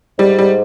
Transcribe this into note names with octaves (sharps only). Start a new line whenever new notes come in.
G#2 G3
G3